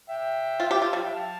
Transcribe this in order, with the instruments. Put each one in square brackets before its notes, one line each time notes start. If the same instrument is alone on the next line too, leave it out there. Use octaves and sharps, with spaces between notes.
[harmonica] E5 G5
[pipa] F4
G4
F4
[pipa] G3 [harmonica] F5 A5
[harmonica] E5 G5
F5 A5